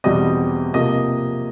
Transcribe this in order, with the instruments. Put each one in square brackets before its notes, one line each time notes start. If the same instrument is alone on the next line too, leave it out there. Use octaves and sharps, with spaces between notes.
[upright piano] E2 B2 G3 C4 D#5
C3 F3 A#3 D#5